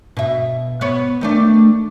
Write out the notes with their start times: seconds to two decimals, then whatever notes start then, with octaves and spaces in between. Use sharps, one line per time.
0.17 B2 E5
0.81 B3 C#5
1.21 D#3 A3 D4